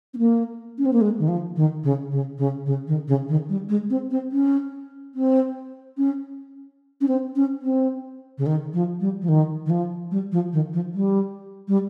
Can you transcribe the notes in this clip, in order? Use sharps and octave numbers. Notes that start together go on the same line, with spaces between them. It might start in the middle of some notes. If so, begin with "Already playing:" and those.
C4
A#3
C#4
C4
A#3
G#3
D#3
F3
D#3
C#3
C#3
C#3
C#3
D#3
C#3
D#3
G3
G#3
C4
C4
C#4
C4
C#4
C#4
C4
C#4
C4
C#3
D#3
F3
G3
F3
D#3
D#3
F3
G3
F3
D#3
F3
G3
G3